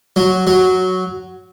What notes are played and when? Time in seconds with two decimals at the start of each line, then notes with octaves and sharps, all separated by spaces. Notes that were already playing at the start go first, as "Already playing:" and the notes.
0.16 F#3
0.47 F#3